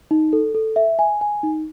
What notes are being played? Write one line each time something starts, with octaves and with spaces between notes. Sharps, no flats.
D#4
A4
A4
E5
G#5
G#5
D#4